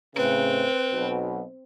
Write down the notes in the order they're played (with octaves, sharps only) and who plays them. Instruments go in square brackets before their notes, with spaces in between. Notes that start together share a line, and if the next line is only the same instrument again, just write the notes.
[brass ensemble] A2 C#3 [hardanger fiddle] C4 [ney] B4
[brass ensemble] B1 B2